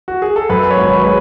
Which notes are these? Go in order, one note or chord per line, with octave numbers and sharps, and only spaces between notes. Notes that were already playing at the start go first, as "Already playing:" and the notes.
F#4
G#4
A4
F#2 B4
C#5
G#1
B4
C#5
G#3 B4